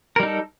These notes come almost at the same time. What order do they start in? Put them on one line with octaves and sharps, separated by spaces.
A#4 G3 D#4 A4